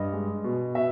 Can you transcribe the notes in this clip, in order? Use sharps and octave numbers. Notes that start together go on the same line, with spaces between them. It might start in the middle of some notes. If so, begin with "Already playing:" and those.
Already playing: G2 D#5
G#3
B2
B2 E5